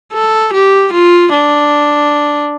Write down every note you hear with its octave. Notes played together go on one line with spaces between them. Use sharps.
A4
G4
F4
D4